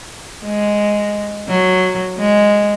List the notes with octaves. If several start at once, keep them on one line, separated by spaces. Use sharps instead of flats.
G#3
F#3
G#3